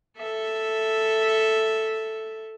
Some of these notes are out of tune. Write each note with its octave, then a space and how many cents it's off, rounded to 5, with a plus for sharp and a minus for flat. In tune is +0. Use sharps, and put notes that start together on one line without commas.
A4 +0 E5 +0